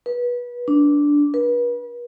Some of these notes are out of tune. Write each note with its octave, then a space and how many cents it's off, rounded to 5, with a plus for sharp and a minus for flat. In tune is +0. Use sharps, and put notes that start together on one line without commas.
B4 -25
D4 -10
B4 -35